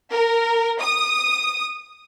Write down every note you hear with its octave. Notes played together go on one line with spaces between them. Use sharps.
A#4
D#6